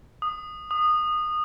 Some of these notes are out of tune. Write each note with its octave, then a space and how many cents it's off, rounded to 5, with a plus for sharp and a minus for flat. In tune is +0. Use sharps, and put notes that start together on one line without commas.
D#6 -15
D#6 -20